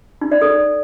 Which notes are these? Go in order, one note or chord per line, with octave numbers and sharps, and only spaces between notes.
D#4
D5
A4